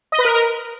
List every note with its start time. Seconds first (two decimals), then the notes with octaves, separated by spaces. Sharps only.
0.12 D#5
0.18 B4
0.25 A#4